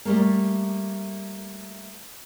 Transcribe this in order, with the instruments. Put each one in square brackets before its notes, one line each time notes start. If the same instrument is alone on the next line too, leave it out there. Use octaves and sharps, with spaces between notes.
[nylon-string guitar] G3 A3 A#3